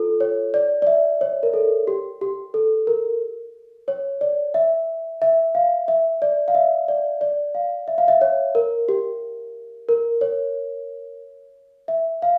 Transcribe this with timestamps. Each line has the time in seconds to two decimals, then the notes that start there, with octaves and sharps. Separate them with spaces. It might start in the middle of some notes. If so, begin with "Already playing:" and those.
Already playing: F4 A4
0.20 C#5
0.54 D5
0.82 D5
0.87 E5
1.21 C#5
1.43 A#4
1.53 A4
1.87 G4
2.21 G4
2.54 A4
2.87 A#4
3.88 C#5
4.21 D5
4.54 E5
5.22 E5
5.55 F5
5.88 E5
6.22 D5
6.48 F5
6.55 E5
6.88 D5
7.21 D5
7.55 F5
7.88 E5
7.98 F5
8.08 E5
8.21 C#5
8.55 A#4
8.89 G4
9.89 A#4
10.21 C#5
11.88 E5
12.22 F5